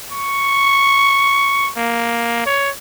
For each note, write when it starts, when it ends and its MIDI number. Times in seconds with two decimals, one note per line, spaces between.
0.12 1.70 85
1.77 2.43 58
2.46 2.70 73